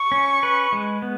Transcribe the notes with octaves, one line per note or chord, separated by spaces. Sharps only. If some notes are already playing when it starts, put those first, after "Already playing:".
Already playing: C#6
C#4
B4
G#3
B3